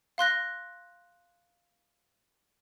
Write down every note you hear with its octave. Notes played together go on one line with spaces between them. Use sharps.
F5 C6 F#6 A#6